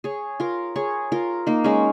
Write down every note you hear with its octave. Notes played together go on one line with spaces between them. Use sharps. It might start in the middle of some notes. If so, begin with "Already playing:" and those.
G#4 C#5
F4 A#4
G#4 C#5
F4 A#4
A#3 D#4
G#3 C#4